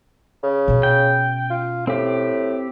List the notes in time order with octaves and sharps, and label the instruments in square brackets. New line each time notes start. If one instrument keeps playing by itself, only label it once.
[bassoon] C#3
[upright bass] B2 C#4
[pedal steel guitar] G5
[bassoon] F4
[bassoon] A2 [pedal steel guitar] C4 G4